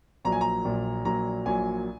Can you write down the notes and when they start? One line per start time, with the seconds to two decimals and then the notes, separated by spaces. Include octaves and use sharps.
0.25 A#1 A#2 F#3 A#5
0.32 G#5
0.41 A#5
0.64 A#1 A#2 F#3
1.05 A#1 A#2 F#3 A#5
1.46 A#1 A#2 F#3 G#5